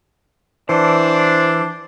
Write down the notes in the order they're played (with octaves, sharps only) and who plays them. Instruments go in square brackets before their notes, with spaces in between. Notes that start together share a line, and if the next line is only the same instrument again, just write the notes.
[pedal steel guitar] E3 [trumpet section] D4 [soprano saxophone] C5